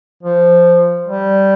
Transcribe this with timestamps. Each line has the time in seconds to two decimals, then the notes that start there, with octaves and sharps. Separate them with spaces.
0.23 F3
1.07 G3